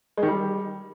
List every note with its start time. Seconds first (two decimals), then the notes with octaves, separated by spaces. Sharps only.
0.17 G#3
0.23 D#3
0.28 G3